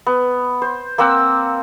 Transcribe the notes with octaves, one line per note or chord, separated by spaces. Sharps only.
B3
C5
A#3 C4 F#5 E6